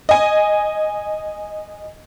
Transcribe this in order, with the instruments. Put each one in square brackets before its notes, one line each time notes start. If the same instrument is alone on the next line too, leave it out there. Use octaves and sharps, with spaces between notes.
[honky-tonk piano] D#5 G#5